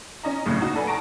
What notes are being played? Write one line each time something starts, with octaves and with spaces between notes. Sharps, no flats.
C#4 D#5 A#5
D2 A2 C#3
D#4 F#4
D4 A4 B4 G#5
F#5 A5 A#5 C#6 A#6 D7